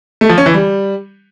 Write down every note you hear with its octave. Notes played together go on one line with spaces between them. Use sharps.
A3
F3
C#4
E3
G3